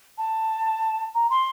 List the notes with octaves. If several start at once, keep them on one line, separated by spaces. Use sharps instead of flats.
A5
A#5
C6